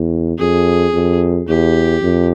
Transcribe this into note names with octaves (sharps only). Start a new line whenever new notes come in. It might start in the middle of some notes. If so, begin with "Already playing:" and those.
Already playing: E2
F2 G#4
F2
E2 G4
F2